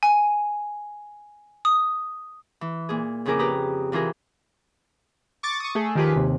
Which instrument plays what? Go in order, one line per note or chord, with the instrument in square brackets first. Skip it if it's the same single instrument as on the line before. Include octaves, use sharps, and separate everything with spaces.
[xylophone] G#5
D#6
[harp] E3
A#2 G#4
F2 C#3 E4 G#4 A#4 D6
G4 B4 A#5 D#6
C3 E3 F4 G#4 A#4
[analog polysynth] C#6 D6 A6
C#6 D#6
A3 G#4 A4
D#3 F3 G4 G#4 B4
D#2 C3